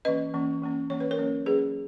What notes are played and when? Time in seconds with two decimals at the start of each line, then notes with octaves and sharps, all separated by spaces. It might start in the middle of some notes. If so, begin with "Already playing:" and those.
0.05 E3 A#3 C#4 B4 D#5
0.34 E3 A#3 C#4
0.62 E3 A#3 C#4
0.90 E3 A#3 C#4 C#5
1.00 B4
1.11 A#4 C#5
1.18 F#3 A#3 C#4
1.46 F#3 A#3 C#4 G#4 B4